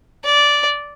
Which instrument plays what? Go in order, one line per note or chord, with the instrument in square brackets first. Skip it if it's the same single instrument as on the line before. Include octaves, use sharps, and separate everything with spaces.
[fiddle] D5